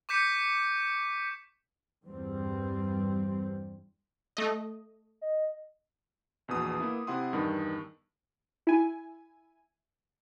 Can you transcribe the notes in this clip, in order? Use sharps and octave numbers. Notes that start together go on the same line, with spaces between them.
C#6 D6 G6 B6 C#7
E2 G2 G3 C4
A3 D#5
D#5
A#1 E2 B2 D#6
A#3 B3 E4
C3 E4 F#5 C6 D#6
E2 G2 D#3
E4 G#5